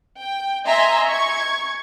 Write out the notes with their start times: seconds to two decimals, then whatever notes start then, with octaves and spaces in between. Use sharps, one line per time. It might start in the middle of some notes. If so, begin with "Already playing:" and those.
0.19 G5
0.67 D#5 E5 G#5 A#5 C6
1.08 C#6 G#6